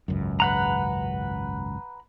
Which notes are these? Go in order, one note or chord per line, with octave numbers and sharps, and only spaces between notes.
G#1 C#2 F#2
B4 F#5 A#5